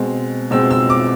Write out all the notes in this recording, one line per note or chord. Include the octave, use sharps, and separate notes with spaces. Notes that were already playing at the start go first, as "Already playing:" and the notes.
Already playing: B2 G#3 C4
B2 G#3 C4 E6
E6
D6